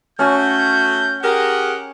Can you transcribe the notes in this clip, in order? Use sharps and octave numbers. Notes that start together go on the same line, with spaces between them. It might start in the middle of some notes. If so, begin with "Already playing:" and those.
A3 C#4 F#4 G6
G4 G#4 A#4 F#5